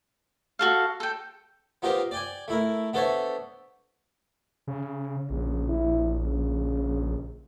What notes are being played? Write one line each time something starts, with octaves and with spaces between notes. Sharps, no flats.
F#4 A4 F5
A4 G5
B3 D#4 F4 G4 A#4 C5
D5 G5 G#5
A3 E4 A#4
B3 D4 A4 C5 C#5 E5
C#3
A#1 C#3
E4
C#3